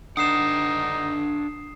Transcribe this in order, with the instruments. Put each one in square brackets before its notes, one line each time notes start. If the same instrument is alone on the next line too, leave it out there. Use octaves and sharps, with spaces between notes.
[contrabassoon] D3 [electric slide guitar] D4 B4 F#5 [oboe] D#4 [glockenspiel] D#6 C7 E7